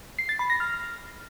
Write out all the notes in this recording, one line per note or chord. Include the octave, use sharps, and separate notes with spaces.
C7
A6
B5
A#6
F6